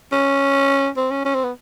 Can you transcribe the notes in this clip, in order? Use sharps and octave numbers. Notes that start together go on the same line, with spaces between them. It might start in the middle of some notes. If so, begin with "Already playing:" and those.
C#4
C4
C#4
C#4
C4
B3